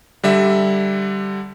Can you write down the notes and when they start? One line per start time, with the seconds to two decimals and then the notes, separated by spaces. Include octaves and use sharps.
0.23 D3 G3 E5